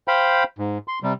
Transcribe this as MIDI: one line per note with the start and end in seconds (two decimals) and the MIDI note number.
0.08 0.44 72
0.08 0.44 77
0.08 0.44 79
0.08 0.44 83
0.59 0.78 44
0.88 0.99 84
1.03 1.13 48
1.03 1.13 55